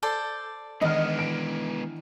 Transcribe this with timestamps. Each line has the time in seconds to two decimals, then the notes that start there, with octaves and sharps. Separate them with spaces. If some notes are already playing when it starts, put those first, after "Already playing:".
0.03 A4 C5 D5
0.81 D#3 E3 G#3 B3 D4 D#5 F6
1.19 D7